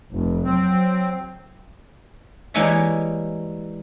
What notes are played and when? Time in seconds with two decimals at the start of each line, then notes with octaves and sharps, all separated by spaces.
0.12 F1
0.45 F#3 C4
2.54 E3 G3 G#3 A#3 C#5 E5